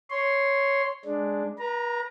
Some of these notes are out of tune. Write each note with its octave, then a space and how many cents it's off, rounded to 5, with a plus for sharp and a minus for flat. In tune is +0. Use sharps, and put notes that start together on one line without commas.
C#5 +0 C6 +0
G#3 +0 D4 +0
B4 -45 A#5 +0